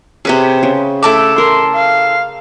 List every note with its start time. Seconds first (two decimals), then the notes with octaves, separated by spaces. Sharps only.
0.25 C3 C#4 G#4 B4 C5
0.63 C#3
1.03 A3 E4 A4 D6
1.38 A#4 C6
1.74 F5